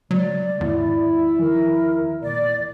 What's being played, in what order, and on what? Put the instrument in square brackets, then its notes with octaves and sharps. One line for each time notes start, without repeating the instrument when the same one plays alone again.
[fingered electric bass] C#3 G#3 [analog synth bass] F#3 [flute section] D5
[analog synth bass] E2 [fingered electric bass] G#2 D#3 [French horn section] E4
[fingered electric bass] D#3 F3 [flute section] A#4
[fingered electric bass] E1 A#1 [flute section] D5